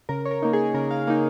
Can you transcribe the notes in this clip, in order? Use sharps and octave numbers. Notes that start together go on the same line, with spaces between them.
C#3 A#4
C#5
A#4
A#3 D#4
G#4
C#3 A#4
F5
A#3 D#4 F5